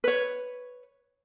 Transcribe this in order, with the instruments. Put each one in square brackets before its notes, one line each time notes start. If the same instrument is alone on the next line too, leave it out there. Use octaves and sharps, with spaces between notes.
[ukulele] B4 C#5